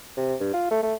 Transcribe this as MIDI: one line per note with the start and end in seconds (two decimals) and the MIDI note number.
0.17 0.34 48
0.40 0.51 43
0.53 0.66 65
0.71 0.80 57
0.83 0.94 57